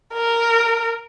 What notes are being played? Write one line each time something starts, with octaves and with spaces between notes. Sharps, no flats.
A#4